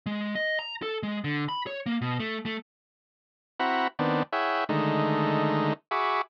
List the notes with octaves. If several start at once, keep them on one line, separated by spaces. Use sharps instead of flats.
G#3
D#5
A#5
A4
G#3
D3
B5
C#5
A#3
B2
A3
A3
C4 E4 F#4 F#5 A#5 B5
D#3 B3 C4 D4
E4 G#4 C#5 E5 F#5 G5
D3 D#3 G#3 A3 D#4
F#4 G#4 E5 B5 C#6 D6